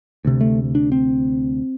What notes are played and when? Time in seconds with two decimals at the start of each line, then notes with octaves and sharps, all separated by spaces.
0.25 D2 C3
0.41 A3
0.75 D4
0.92 C4